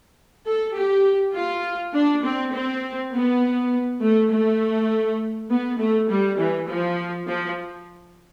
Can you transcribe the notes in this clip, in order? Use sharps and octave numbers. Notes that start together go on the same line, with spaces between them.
A4
G4
F4
D4
C4
C4
B3
A3
A3
B3
A3
G3
E3
F3
F3